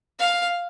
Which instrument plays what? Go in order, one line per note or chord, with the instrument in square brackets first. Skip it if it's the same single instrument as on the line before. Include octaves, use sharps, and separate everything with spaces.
[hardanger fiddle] F5